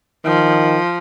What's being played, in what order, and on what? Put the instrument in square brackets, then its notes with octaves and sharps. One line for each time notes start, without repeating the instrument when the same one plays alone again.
[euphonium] D#3 [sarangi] F3